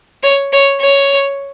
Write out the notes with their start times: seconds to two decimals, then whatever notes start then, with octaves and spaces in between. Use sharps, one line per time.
0.23 C#5
0.53 C#5
0.81 C#5